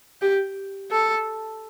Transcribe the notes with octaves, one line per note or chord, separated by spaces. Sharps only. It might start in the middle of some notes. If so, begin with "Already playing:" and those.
G4
A4